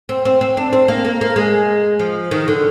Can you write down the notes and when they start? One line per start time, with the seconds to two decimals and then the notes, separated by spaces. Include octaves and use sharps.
0.09 C4
0.25 C4
0.41 C4
0.57 D4
0.73 C4
0.88 A#3
1.05 A#3
1.21 A#3
1.36 G#3
1.99 F3
2.31 D#3
2.48 D3